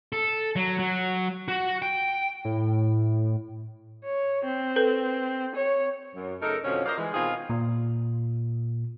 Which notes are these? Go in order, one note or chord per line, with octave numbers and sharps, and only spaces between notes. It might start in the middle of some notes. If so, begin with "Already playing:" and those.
A4
F#3
F#3
F#4
G5
A2
C#5
C4
A4 B4 G6
C#5
F#2
C#3 A3 D#4 A4 A#4
F2 B2 D3 F3 F#3 C#4
A#4 C5 D5 D#5 F5
E3 G#3
B2 D#3 C4 F4 G#4
A#2